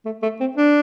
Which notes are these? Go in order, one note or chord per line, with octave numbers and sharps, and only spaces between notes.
A3
A3
C4
D4